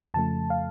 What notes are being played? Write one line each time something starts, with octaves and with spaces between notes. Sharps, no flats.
F2 C#3 F3 A3 A5
F5